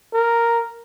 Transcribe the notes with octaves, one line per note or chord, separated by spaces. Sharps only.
A#4